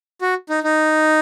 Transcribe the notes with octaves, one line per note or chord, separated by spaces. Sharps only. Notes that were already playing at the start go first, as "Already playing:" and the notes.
F#4
D#4
D#4